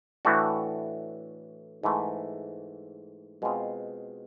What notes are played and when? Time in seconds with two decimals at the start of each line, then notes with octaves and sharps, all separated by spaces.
0.25 A2 E3 A3 D4 F#4
1.83 G#2 E3 A3
3.42 B2 G#3 C4 F4